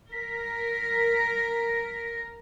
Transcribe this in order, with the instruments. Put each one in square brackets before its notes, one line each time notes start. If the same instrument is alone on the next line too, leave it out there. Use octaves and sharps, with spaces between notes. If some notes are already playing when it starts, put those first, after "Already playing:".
[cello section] A#4 [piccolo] B6